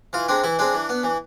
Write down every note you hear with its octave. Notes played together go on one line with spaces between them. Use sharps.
E3 F4
G#3 C4 D4
E3 E4
G#3 C4 D4
E3
B3
E3